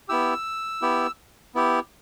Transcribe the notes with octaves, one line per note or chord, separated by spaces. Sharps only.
B3 E4 G4 E6
B3 E4 G4
B3 E4 G4